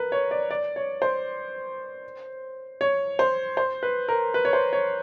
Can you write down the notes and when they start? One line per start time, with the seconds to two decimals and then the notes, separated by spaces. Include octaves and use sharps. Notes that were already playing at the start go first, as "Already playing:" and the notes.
Already playing: A#4 B4
0.12 C#5
0.31 D5
0.51 D5
0.76 C#5
1.02 C5
2.81 C#5
3.19 C5
3.57 C5
3.83 B4
4.08 A#4
4.34 B4
4.45 C#5
4.53 C5
4.73 C#5